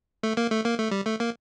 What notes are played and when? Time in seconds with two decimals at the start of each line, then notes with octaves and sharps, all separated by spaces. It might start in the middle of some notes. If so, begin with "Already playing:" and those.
0.23 A3
0.37 A#3
0.51 A3
0.65 A#3
0.79 A3
0.91 G3
1.05 A3
1.20 A#3